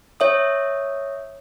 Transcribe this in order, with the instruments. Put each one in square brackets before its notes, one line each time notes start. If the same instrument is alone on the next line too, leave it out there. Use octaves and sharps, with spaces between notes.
[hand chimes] C#5 E5 D#6